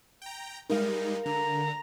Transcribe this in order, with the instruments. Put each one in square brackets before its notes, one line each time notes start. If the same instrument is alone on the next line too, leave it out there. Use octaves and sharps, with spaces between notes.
[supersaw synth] G5 A#5
[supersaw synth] G3 G#3 D#4 [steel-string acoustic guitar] A#4 F5
[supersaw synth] D3 [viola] A#5